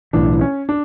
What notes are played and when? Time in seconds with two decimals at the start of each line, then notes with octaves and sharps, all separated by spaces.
0.13 B1 A2 E3 D4
0.41 C#4
0.69 D4